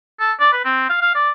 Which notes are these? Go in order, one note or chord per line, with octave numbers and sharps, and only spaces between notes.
A4
D5
B4
C4
F5
F5
D5